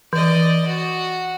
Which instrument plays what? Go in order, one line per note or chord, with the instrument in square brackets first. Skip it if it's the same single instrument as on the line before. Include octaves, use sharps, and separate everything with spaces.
[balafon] E3 [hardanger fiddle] D5 D#5
[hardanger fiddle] F#4